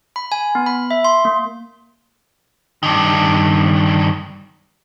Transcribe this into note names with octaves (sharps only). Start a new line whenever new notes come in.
B5
G#5
B3
B5
E5
C6
A#3
G2 D#3